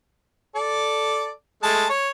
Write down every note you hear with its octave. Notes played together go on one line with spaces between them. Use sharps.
A4 D5
G#3 A3 A5
C#5